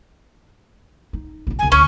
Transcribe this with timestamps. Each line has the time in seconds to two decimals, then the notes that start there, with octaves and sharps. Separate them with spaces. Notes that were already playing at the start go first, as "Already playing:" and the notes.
1.13 D#4
1.47 B1 C#4
1.59 C2 G3 G#5
1.72 D2 C#4 C#6